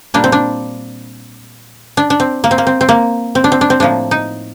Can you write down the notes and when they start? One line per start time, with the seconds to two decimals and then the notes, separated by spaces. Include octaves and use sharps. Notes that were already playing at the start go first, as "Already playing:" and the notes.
0.14 A#2 G3 A#3 D4
0.24 C4
0.32 D4
1.97 D4
2.10 D4
2.20 C4
2.44 A#3
2.51 C4
2.58 A#3
2.67 C4
2.81 C4
2.89 A#3
3.35 C4
3.44 D4
3.52 C4
3.61 D4
3.70 C4
3.80 A2 F3 A#3 D4
4.11 D#4